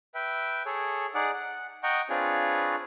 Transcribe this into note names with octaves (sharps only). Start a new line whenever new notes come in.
B4 E5 G5
G#4 A4 C#5
D#4 G#4 D5 F#5
F#5
D#5 F#5 G5 A#5 C#6
C4 D4 F4 G#4 B4 C#5